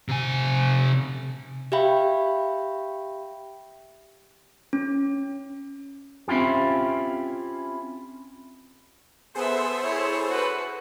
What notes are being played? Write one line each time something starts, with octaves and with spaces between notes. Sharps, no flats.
C3 G#5
G4 E5 F5 G5 B5
C#4
C4 C#4 E4 F4 G4
B3 G#4 A4 C5 E5
E4 C#5
F#4 B4